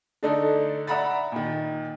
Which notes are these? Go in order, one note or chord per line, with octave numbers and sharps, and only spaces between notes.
D3 A3 D4 D#4 A4
D5 E5 F#5 A#5 B5 A6
A#2 D#3